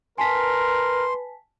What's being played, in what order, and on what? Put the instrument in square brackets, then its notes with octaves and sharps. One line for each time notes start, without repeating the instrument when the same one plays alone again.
[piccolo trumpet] A#4 [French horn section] B4 [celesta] G#5 A5 B6 [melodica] C6